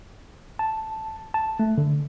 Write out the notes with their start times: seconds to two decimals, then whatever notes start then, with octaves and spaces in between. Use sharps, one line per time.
0.59 A5
1.34 A5
1.60 A3
1.78 D3